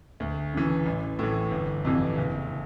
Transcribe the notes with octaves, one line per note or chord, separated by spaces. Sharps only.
D2
C#3 E3
A1
A2 E3
G1
F2 C3 E3
F#1